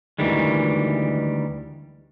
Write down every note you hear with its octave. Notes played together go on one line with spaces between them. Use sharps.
D2 D#3 E3 G3 G#3